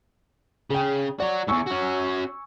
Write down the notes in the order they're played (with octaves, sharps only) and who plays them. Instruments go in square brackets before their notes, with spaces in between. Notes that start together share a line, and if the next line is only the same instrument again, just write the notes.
[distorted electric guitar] C#3 [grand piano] G#4 G5
[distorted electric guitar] F#4 C#5 [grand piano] D5
[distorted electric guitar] E2 G#2 [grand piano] G#5 C#6 E6
[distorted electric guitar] C#4 F#4